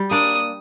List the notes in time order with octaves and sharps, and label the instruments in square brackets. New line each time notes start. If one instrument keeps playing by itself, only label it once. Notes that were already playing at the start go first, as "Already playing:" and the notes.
Already playing: [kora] G3
[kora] A#3 D4 [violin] D#6